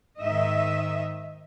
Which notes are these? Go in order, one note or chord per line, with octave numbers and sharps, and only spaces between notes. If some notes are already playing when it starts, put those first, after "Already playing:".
G#2 D#3 D#5 E5